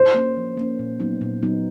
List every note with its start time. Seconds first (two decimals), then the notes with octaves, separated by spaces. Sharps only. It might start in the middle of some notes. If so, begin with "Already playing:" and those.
Already playing: C5
0.14 A#3 C#4
0.37 F3
0.57 A#3 C#4
0.79 A#2
1.00 F#3 B3 D#4
1.21 A#2
1.43 F#3 B3 D#4